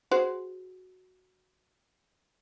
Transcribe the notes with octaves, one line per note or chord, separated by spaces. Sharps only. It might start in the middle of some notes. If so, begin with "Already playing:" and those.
F#4 G#4 C5